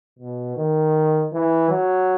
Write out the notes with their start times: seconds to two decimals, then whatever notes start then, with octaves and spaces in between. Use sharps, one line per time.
0.19 B2
0.57 D#3
1.32 E3
1.70 F#3